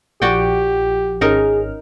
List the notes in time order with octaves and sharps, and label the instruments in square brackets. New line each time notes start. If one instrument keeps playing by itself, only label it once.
[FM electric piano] A#1 F3 [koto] F#4 D5 G5 [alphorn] G4
[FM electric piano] G#1 C#4 F6 [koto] D#4 A#4 [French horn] G#4